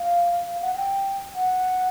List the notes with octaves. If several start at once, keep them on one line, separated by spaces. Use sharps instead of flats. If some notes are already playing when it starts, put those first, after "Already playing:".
Already playing: F5
F5
F#5
G5
F#5